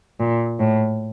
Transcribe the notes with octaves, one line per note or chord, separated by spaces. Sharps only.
A#2
A2